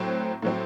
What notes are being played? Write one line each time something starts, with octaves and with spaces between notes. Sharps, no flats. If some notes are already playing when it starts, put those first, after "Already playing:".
Already playing: A2 F#3 C4
A2 F#3 C4